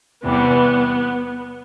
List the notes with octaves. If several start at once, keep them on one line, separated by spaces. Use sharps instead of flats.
E2 C3 E3 G3 B3